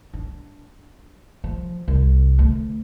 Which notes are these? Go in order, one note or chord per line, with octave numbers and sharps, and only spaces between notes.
D4
F3
C2
D2